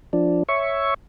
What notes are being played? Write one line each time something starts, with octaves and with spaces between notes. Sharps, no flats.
F3 D4
C#5 E5 C#6